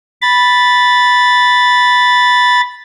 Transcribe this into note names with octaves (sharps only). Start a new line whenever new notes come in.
B5 A6